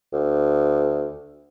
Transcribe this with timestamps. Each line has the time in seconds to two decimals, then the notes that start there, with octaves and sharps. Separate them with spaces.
0.13 D2